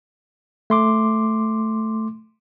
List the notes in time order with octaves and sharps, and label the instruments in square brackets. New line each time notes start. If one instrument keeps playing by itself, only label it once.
[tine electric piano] A3 C6 D6